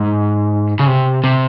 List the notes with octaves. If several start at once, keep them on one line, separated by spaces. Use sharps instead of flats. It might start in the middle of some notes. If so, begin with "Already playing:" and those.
Already playing: G#2
C#3
C3
C3